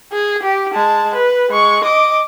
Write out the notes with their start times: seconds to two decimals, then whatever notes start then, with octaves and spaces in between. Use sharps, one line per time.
0.12 G#4
0.43 G4
0.73 G#3 A5
1.14 B4
1.50 G#3 C#6
1.84 D#5 D6